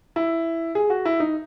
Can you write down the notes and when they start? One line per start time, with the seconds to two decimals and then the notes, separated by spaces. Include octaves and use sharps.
0.16 E4
0.75 G#4
0.90 F#4
1.05 E4
1.20 D#4